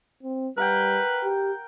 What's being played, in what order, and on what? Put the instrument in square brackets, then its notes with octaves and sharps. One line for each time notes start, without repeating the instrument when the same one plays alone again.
[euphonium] C4
[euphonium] G3 [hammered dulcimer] A#4 F#5 G5 [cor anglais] B4
[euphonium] G4